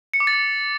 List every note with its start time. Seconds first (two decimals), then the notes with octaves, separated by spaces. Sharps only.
0.14 C#7
0.20 D6
0.27 A6